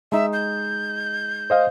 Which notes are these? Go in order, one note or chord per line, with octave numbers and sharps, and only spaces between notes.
G#3 D#4 E5
G6
C5 D#5 F5